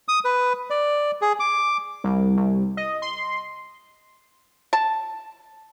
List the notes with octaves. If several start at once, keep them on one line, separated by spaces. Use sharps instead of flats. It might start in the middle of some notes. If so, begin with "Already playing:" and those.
D#6
B4
D5
G#4
D6
C2
C2
D#5
C6
A5